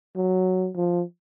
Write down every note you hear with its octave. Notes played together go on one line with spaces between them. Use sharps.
F#3
F3